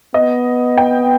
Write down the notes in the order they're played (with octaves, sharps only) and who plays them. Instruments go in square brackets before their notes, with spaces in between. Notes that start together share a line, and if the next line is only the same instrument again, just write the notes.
[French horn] B3 [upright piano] D#5
[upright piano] G5